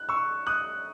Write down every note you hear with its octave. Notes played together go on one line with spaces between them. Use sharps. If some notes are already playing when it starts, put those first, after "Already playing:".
Already playing: F#6
C#6 E6
D#6 F#6